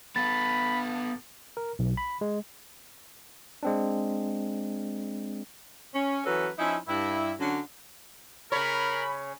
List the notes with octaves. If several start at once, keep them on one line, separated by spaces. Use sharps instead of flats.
B3 A4 B5 A6
A#4
B1
B5
G#3
G#3 C4 D4
C#4
E3 F#3 C#4 F#4 A4 B4
F3 C#4 D#4 E4
G2 E4
D3 F#3 C#4
C#3 A#4 C#5 B5